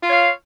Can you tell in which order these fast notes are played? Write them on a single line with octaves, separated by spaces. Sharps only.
F4 C#5 F5